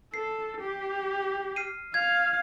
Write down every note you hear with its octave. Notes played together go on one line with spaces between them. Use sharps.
A4 C7
G4
F6 C7 D#7
F5 G#6